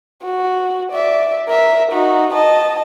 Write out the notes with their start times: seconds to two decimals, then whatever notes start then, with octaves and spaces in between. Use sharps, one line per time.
0.23 F#4
0.92 D5 E5
1.48 A#4 E5
1.92 D#4 F#4
2.33 D#5 A5